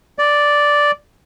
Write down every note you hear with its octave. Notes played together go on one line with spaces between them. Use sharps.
D5